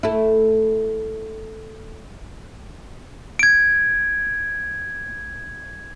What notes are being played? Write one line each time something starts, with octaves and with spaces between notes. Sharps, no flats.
A3 E4
G#6 D7